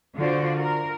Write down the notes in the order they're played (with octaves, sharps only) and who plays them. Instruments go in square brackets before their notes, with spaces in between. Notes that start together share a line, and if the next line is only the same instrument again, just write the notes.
[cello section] D3 F4 F#4 C5 D5
A#4